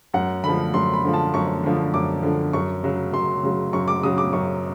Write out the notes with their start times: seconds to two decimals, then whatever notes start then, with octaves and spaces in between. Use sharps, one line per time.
0.14 F#2 F#5
0.44 D3 F3 B5
0.74 F#2 C6
0.93 B5
1.04 D3 F3
1.14 A5
1.34 F#2 C#6
1.64 D3 F3
1.94 F#2 D6
2.23 D3 F3
2.53 F#2 C#6
2.83 C#3 F#3
3.13 F#2 C6
3.43 C#3 F#3
3.73 F#2 C#6
3.88 D6
4.03 C#3 F#3 D#6
4.18 D6
4.33 F#2 C#6